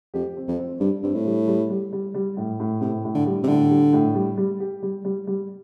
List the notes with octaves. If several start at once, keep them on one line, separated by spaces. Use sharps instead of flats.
F2 G4
C4
F2
C4
G2 G3
G2 C4
A2
G3
G3
G3
G3
G3
A2
A2
A2 C3
A2
D3
G3
C3
A2 D3
G3
A2
G3
G3
G4
G3
G3
G3